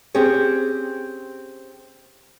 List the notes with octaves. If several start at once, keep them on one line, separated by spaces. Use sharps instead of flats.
C4 C#4 G4 G#4 C#5